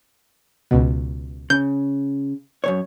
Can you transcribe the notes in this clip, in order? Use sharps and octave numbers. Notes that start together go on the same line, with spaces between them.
C#2 B2
C#3 G6
F#2 C3 C#5